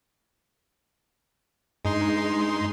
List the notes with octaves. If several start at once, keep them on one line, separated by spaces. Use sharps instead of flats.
G2 G#3 D#4 C6